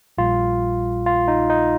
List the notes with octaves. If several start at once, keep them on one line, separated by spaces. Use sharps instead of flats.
A#1 A#2 G3 F4
F4
D#4
D#4